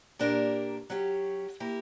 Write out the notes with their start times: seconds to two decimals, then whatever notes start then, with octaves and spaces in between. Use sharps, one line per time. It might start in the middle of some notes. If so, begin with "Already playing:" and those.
0.19 A#2 A#3 D4 G4 A#4
0.90 F#3 C#4 G4
1.60 A#3 E4 G4